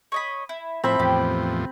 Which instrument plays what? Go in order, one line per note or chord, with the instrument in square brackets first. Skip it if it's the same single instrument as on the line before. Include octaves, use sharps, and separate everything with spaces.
[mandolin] C#5 D#5 B5
E4
[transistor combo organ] A2 F3 [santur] C4 B5 [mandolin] E4 E5
[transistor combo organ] E2 A2 F3 [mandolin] G4